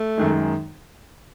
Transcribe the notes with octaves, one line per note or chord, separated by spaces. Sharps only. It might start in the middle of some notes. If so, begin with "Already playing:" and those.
Already playing: A3
F#2 D#3 G#3